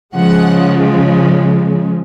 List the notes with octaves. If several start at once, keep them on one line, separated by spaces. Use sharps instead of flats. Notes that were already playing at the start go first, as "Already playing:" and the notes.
C#3 F3 G#3 F#5